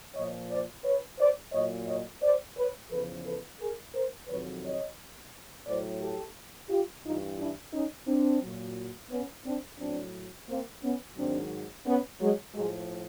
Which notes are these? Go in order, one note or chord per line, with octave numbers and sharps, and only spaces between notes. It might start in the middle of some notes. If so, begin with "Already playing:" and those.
A#2 F3 C#5 D#5
C5 D5
B4 C#5
C5 D5
A#2 F#3 C#5 D#5
C#5 D#5
C5 D5
B4 C#5
E2 C#3 F3 A4 B4
A4 B4
G#4 A#4
A#4 C5
F2 C3 D#3 F#3 B4 C#5
C#5 D#5
A2 F#3 C5 D5
G4 A4
F4 G4
G2 E3 D#4 F4
D4 E4
C#4 D#4
C4 D4
A#2 F#3
B3 C#4
C4 D4
A2 F#3 C4 D4
A#3 C4
B3 C#4
G#2 D#3 F#3 C4 D4
B3 C#4
F#3 G#3
A2 F3 F#3 G#3